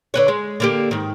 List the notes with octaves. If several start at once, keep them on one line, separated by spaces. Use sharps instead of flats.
D3 B4 C#5
G#3
D3 A#3 G4
G#2 D#3